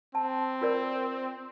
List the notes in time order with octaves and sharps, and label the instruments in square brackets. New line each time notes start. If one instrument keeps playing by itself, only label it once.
[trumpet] C4 [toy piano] A5
[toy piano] F4 A#4 D5